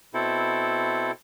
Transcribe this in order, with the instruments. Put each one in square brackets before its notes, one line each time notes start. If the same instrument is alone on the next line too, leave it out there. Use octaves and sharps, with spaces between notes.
[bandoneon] B2 C4 E4 A4